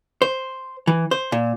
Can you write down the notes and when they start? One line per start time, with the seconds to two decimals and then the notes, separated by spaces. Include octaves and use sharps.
0.22 C5
0.87 E3
1.11 C5
1.32 A#2